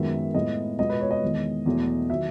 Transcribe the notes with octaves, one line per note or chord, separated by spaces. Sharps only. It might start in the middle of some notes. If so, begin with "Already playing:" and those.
Already playing: F#2 D#3 G#3 B3 E5
A2 G#3 B3 D#5
B2 G#3 B3 D#5
B4
C#5
D#5
E2 D#3 G#3
E2 B2 F#3 A3
D#3 F#3 E5